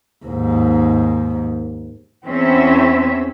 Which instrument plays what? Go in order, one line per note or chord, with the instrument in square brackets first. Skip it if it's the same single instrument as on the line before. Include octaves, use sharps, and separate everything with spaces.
[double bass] D#2 G#2
[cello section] E2 C4 C#4 E5